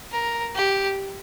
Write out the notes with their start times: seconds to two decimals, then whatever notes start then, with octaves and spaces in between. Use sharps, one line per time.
0.12 A#4
0.55 G4